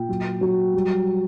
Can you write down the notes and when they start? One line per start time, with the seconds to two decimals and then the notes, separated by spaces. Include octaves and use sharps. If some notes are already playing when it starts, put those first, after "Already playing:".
Already playing: A#2 G5
0.09 F#3
0.41 F#3
0.73 G3